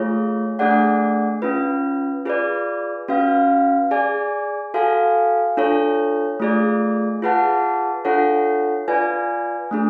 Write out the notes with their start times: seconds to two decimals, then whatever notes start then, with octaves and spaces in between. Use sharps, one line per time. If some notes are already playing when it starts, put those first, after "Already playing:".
Already playing: A3 F4 G#4 C#5
0.59 A3 D4 G#4 D5 F#5
1.42 C#4 F4 B4
2.25 F4 G#4 B4 D5
3.08 C#4 F#4 B4 F5
3.91 G#4 D5 G#5
4.74 F#4 A4 F5 G#5
5.57 D4 F4 A4 C#5
6.40 A3 F4 G#4 D5
7.22 F4 G#4 B4 F#5 A5
8.05 D4 F4 A4 C#5 F#5
8.88 F4 B4 D5 G#5
9.71 A3 D4 G#4